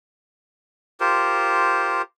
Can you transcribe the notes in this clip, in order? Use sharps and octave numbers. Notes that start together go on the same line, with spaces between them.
F4 G4 A#4 C5